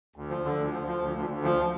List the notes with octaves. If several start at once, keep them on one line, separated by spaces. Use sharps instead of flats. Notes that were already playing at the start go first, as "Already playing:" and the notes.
D2
F3
D3
D2
F3
F3
D2
D2
D2
F3